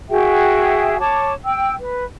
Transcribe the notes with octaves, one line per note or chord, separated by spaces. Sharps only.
F#4 G#4 E5 G5
C#5 A5 D6
G5 E6
B4